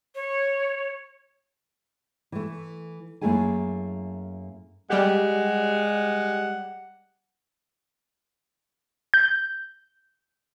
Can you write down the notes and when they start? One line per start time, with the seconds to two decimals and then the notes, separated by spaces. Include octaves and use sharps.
0.15 C#5
2.32 E3 A3
3.21 F#2 A3 A#3 E4 G#4 G#5
4.90 G3 G#3 G4 F#5
9.14 G6